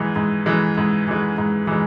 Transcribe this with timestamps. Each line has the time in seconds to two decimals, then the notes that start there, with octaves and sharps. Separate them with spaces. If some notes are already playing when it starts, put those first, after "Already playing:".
Already playing: G#2 E3 G#3
0.16 G#2
0.46 E3 G#3
0.78 G#2
1.08 E3 G#3
1.38 G#2
1.67 E3 G#3